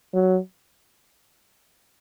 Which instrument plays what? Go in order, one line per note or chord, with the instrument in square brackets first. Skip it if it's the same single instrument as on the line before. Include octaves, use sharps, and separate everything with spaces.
[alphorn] F#3